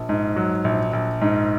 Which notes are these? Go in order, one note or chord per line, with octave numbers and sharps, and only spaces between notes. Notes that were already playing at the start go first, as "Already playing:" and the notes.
Already playing: A#1
G#2
F#3
A#1
A#1
G#2